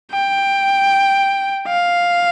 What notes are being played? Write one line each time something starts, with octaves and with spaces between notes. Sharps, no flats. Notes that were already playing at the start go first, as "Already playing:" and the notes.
G5
F5